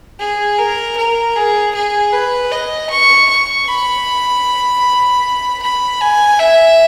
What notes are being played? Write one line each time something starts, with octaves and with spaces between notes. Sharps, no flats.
G#4
A#4
A#4
G#4
G#4
B4
D#5
C#6
C#6
B5
B5
G#5
E5